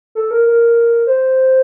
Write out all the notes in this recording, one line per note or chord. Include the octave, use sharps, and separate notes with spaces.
A4
A#4
A#4
C5